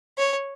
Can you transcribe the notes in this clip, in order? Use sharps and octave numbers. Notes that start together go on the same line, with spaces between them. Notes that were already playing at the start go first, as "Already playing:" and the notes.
C#5